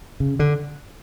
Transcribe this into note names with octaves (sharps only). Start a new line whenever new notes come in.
C#3
D3